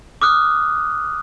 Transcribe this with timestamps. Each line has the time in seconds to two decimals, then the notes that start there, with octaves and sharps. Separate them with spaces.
0.22 D6 D#6 F6 F#6